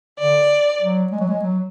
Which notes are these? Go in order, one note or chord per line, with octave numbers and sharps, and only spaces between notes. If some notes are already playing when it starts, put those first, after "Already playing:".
D3 D5
F#3
G#3
F#3
G#3
F#3